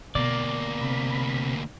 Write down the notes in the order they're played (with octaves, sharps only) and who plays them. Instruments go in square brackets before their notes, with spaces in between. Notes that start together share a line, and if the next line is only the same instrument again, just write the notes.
[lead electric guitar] D2 A#3 [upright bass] B2 [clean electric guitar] D5
[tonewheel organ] C3 B5